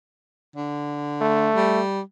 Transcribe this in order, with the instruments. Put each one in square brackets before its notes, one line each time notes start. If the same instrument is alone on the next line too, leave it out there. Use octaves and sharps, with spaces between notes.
[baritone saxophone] D3
[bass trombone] A3
[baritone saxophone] G3